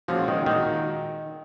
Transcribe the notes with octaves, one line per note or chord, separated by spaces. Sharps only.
A#2 F3 G#3 C#4 F#4
D#3
A#2 D#3 G#3 D#4 F#4